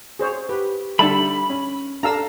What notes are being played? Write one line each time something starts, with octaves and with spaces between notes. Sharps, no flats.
G#4 C5 C#5
G4 B4
D3 G3 A4 E5 A5 B5
C#4
D4 A4 F5 A#5 E6